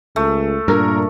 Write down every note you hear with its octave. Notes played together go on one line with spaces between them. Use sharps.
C#2 A3
G2 A#2 A#4